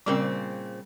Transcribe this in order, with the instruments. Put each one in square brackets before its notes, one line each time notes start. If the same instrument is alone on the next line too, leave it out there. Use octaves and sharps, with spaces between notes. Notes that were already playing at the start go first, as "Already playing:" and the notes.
[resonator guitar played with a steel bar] A#2 C#3 C4 [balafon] G3 A#4 C5